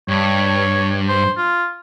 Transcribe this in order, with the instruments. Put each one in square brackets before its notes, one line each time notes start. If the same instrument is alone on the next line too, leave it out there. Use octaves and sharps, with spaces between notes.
[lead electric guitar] G2 [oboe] C#5
[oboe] C5
F4